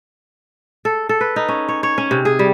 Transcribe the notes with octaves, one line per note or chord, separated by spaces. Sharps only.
A4
A4
B4
D#4
C#4
C#5
C#5
C#4
C3
G#4
G3